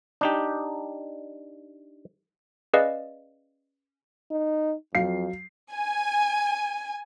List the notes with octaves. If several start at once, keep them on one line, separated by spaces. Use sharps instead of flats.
D4 D#4 G4
C#4 G#4 B4 D5 D#5 F5
D#4
F2 F#3 F5 C7
G#5